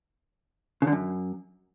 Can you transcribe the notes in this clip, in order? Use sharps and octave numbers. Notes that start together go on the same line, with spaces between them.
C#3
D3
F#2